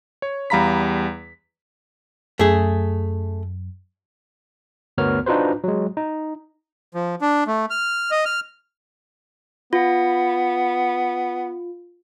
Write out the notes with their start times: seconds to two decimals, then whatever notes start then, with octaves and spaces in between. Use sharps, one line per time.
0.22 C#5
0.50 E2 G3 F5 A#5 B5 B6
2.39 F#2 A3 G#4
4.98 G1 D2 B3 A#4 C#5 F6
5.26 D4 D#4 F4 F#4 B4 C5
5.64 F#3 G#3
5.97 D#4
6.95 F3
7.22 D4
7.47 A3
7.70 F6
8.11 D#5
8.25 F6
9.73 B3 F4